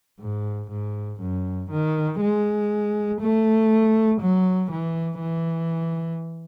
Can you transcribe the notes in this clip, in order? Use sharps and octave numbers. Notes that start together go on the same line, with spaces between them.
G#2
G#2
F#2
D#3
G#3
A3
F#3
E3
E3